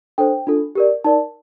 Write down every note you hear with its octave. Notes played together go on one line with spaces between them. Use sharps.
D4 A4 C5 G5
D4 F4 A4
G4 A#4 D5
D#4 A#4 D5 A5